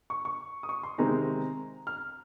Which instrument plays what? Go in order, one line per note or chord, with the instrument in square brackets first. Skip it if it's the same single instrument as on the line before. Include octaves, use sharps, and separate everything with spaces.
[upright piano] C#6
C#6
D#6
C#6
C6
C3 D#3 G#3 C4 D#4 A#5
F6